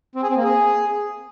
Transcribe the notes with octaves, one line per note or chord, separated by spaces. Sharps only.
C4
G#4
C4
A#3
G#4